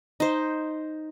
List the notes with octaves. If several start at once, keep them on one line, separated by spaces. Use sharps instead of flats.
D#4 C5